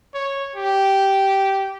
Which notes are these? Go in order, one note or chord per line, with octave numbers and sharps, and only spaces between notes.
C#5
G4